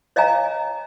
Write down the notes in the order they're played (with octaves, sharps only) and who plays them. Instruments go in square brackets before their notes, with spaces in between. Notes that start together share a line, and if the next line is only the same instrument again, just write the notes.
[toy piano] C#5 D#5 F5 G#5 A#5